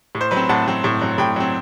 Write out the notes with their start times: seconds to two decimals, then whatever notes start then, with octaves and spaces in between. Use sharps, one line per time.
0.15 A2
0.21 C5
0.31 F#3 B4
0.37 C4
0.49 A2 F#5 A5
0.67 F#3 C4
0.84 A2
1.01 F#3 C4
1.18 A2 G5 B5
1.36 F#3 C4